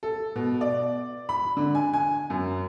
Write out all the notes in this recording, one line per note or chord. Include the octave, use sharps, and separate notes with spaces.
A4
B2
D5
B5
D3
G#5
G#5
F#2